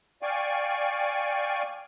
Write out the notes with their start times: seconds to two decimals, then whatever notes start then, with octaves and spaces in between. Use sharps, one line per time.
0.22 D5 F5 G5 G#5 C#6